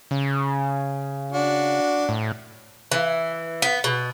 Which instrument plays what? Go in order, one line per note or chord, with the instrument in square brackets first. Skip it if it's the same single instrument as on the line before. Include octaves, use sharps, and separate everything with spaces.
[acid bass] C#3
[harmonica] D4 F#4
[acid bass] A2
[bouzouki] E3
B3
B2